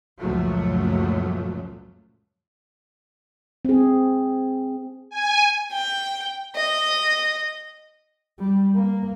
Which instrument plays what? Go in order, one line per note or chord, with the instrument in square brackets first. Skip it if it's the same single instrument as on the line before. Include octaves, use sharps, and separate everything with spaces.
[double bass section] C#2 F#2 A#2 F3 F#3 A3
[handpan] C4 G#4
[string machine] G#5
[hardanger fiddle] G5
D#5
[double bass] G3
A#3